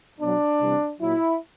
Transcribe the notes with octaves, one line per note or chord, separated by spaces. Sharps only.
B2 F#3 D4
C3 E3 G3
A#2 F#3 E4